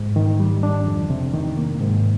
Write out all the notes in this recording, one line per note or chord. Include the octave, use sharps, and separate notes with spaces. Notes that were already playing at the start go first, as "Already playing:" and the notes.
Already playing: G#2
D#3
G3
D4
F2
C3
D#3
A#3
G#2